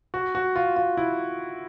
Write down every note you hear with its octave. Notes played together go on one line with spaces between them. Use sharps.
F#4
F#4
F4
F4
E4